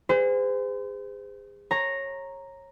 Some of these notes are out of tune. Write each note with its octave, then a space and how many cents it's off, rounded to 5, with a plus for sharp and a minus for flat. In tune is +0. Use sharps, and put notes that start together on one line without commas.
G#4 -35 C5 -40
C#5 -20 A#5 +0